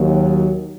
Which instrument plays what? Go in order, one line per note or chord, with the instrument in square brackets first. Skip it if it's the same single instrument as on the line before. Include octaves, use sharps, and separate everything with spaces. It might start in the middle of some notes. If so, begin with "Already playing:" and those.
Already playing: [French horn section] D#2 D#3 F#3